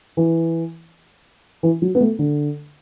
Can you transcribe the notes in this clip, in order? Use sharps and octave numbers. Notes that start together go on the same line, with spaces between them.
E3
E3
F#3
B3
A3
D3